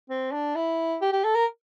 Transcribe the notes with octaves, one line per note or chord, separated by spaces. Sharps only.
C4
D4
E4
G4
G4
A4
A#4